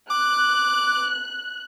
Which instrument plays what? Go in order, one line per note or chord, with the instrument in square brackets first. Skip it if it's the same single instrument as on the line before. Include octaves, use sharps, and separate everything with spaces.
[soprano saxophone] D6 [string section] F#6